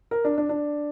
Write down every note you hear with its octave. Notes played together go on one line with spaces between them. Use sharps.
A#4
D4
D4
D4